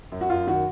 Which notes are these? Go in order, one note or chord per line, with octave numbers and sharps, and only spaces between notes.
F#2
F#4
F#2 F4
D#3 F#4